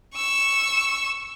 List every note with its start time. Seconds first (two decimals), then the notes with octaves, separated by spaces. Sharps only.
0.15 C#6 E6